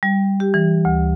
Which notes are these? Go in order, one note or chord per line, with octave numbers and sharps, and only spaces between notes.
G3
G4
E3
D2